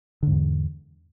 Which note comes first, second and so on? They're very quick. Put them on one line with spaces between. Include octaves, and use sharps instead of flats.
D3 G#2 E2